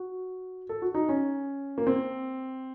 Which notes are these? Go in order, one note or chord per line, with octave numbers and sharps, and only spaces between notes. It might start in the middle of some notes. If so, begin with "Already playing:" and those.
Already playing: F#4
A4
F#4
D#4
C#4
A#3
C4